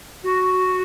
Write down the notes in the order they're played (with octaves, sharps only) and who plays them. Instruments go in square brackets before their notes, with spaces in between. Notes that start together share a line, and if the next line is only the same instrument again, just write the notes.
[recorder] F#4